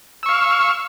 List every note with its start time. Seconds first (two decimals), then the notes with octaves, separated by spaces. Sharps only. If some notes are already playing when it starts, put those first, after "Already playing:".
0.23 E6
0.26 C#6
0.29 F5